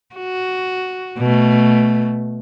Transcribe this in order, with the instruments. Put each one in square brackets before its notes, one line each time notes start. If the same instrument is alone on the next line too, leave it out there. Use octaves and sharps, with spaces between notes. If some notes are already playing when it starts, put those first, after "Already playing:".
[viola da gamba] F#4
B2 A3